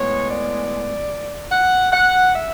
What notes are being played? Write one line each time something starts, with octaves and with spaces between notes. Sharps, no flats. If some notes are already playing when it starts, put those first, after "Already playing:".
Already playing: A2 G#3 B3 C#5
D5
F#5
F#5
E5